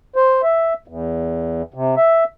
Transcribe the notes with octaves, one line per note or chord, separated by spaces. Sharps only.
C5
E5
E2
C3
E5